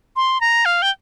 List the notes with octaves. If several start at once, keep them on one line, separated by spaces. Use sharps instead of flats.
C6
A#5
F5
G5